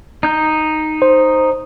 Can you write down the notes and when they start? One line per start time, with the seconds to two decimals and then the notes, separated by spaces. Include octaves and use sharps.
0.23 D#4 G6
1.02 C5